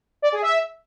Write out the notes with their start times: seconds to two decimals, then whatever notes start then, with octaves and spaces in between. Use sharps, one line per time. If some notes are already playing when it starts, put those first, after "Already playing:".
0.22 D5
0.32 G#4
0.42 E5